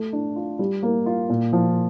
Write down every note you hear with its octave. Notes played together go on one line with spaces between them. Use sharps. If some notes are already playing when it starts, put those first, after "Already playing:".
Already playing: A3
D4
F4
G3
A#3
F4
A#2
F3